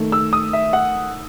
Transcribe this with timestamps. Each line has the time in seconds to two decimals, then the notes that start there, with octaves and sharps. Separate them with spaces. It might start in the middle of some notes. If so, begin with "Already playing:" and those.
Already playing: D#3 A3
0.12 E6
0.33 D#6
0.53 E5
0.73 F#5